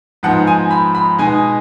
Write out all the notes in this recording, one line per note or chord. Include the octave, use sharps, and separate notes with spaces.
G#2 F3 B3 D#4 F#5
G#5
B5
B5
B2 G#3 B3 D#4 G#5